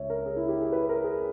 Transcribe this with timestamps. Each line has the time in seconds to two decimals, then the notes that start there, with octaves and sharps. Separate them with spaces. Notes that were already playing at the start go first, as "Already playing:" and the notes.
Already playing: C#2 C#5 E5
0.10 A#4
0.26 G#4
0.36 E4
0.49 G4
0.61 G#4
0.72 B4
0.89 A#4
1.04 G#4